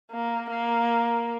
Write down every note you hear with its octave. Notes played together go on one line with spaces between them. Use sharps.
A#3
A#3